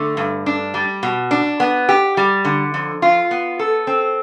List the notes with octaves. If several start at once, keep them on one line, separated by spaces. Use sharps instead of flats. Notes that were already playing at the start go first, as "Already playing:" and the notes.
Already playing: D3 A3
G2
D4
G3
B2
D4
B3
G4
G3
D3
F2
F4
B3
A4
C4